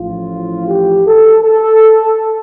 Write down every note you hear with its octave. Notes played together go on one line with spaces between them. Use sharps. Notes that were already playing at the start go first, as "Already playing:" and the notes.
Already playing: A1 A2 F3 F4
G4
A4
A4